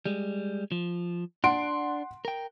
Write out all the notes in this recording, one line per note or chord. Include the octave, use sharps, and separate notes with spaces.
G3 G#3
F3
D4 F#5 C6 D7
A#4 G5